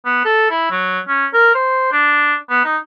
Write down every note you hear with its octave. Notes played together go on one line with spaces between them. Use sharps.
B3
A4
E4
F#3
C#4
A#4
C5
D4
B3
D#4